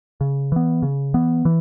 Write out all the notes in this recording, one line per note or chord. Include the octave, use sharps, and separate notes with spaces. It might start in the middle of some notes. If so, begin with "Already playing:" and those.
C#3
E3 B3
C#3
E3 B3
E3